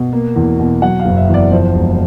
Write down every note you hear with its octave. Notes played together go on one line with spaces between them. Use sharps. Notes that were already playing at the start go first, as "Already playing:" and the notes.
Already playing: B2
A#3
E2
B2
F#3 F#5
F5
F#1
E5
E2
D5
F3 C5
E1